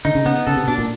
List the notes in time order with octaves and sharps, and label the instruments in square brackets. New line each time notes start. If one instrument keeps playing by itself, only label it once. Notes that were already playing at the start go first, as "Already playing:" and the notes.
[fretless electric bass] D3 [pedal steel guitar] D#4
[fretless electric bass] C#3
[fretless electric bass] C#3 [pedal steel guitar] B3
[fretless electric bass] C#3 [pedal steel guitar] A4
[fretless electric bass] C3
[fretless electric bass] B2 [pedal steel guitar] D4
[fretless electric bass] A#2